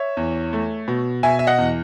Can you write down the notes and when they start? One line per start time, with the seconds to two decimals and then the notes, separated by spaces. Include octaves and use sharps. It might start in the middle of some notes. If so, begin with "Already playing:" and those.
Already playing: C#5 E5
0.17 E2
0.53 A3
0.88 B2
1.23 B2 E5 G#5
1.39 E5
1.47 D#5 F#5
1.58 E2